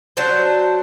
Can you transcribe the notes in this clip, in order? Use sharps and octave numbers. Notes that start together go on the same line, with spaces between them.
F#3 D4 C5